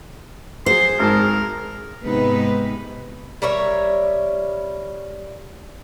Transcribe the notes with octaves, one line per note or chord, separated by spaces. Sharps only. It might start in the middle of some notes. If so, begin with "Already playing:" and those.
F#3 G#4 C5 C6
G#1 G#2 A#4 A5
G#2 C3 G#3 B3 D#4 B4
G3 A#4 C#5 E5